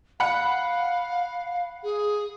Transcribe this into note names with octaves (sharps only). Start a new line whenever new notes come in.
F5 F#5 B5
G#4